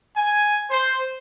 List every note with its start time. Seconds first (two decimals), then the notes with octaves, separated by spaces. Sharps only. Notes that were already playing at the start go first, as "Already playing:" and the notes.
0.17 G#5
0.71 C5